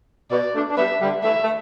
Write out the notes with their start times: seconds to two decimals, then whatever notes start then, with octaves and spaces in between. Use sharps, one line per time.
0.31 B2 D5
0.54 A3 D4
0.70 D4
0.77 G3 B3 E5
1.01 D3 G3
1.23 E3 A3 E5
1.43 A3